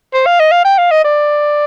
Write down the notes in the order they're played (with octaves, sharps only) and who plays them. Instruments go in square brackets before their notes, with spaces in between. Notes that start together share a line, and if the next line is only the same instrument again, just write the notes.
[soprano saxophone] C5
F5
D#5
F5
G5
F5
D#5
D5